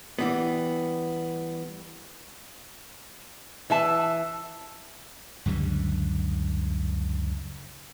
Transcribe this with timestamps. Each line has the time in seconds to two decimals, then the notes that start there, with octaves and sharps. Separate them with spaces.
0.19 E3 G3 B3
3.70 E3 E5 A5
5.46 C#2 F#2 D3 G3